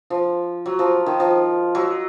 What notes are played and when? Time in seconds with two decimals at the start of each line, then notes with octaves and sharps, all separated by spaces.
0.10 F3
0.66 F#3
0.79 F3
1.06 D#3
1.20 F3
1.75 F#3